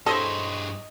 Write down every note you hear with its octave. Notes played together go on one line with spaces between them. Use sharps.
G2 E4 G#4 A4 C5 C#5 D#5